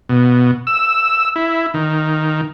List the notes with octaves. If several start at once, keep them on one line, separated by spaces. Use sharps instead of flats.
B2
E6
E4
D#3